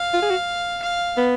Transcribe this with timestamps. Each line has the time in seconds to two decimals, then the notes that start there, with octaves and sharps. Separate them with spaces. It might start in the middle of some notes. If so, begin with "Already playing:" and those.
Already playing: F5
0.13 F4
0.22 G#4
0.30 F#4
0.82 F5
1.17 B3